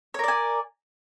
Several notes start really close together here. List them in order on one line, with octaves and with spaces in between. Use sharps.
C#5 A#4 D5 G#5